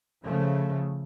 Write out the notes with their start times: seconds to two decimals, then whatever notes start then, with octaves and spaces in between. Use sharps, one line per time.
0.25 C#3 F3 A3